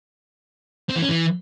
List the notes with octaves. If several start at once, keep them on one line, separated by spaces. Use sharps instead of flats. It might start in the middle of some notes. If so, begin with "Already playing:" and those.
C4
E3
C#4
E3